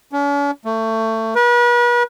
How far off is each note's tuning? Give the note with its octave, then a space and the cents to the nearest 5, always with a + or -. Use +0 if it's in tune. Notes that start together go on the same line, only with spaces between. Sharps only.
C#4 +45
A3 +25
B4 -40